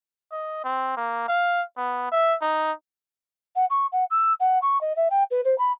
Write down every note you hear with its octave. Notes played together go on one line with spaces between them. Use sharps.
D#5
C4
A#3
F5
B3
E5
D#4
F#5
C#6
F#5
E6
F#5
C#6
D#5
E5
G5
B4
C5
B5